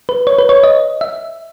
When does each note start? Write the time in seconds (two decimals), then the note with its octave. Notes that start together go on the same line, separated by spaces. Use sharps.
0.09 B4
0.27 C#5
0.39 B4
0.49 C#5
0.64 D#5
1.01 E5